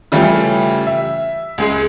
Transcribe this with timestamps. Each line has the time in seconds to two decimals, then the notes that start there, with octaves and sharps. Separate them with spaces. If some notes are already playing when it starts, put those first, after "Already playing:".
0.12 C#3 E3 G3 A3 C#4 F4
0.87 E5
1.58 C#2 G#3 G#4